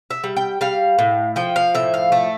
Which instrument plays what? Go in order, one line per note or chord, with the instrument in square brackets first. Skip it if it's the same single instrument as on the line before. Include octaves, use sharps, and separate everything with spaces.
[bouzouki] E5
G3
G5
G3 F5
A2
F3 G5
F5
A2 E5
F5
A3 E5